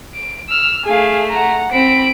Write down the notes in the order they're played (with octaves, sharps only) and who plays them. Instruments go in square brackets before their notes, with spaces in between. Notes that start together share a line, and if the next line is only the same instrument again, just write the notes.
[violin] D7
E6 F6
[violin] A3 G#5 [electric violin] G#4 F5
[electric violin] F#5 A#5
[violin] C4 B5 [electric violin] D7